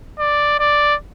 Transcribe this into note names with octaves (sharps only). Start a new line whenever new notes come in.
D5
D5